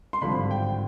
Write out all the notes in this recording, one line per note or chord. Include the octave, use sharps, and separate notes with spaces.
C6
G#1 G2 D3 F3 B5
G5